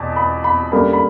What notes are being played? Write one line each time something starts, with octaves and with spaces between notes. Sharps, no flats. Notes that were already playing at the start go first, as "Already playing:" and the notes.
Already playing: E2 B2 A5
B5
B5
F#2 D3 G3 A#3 B5
B5